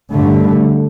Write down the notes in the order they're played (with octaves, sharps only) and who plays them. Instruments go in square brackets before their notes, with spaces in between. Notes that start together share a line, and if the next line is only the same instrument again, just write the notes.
[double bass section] G2 D3 A3